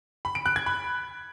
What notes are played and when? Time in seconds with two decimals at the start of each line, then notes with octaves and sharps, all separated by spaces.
0.25 B5
0.35 D7
0.46 F#6
0.56 G#6
0.66 B5